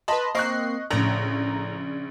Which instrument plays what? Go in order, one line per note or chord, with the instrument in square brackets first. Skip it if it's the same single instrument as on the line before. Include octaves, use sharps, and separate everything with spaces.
[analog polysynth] B4 B5 [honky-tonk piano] D#5 A5 C6
[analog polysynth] A#3 C4 C7 [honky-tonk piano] D#5 C#6 F#6
[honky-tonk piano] A#1 C#3 [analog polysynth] A2 A#5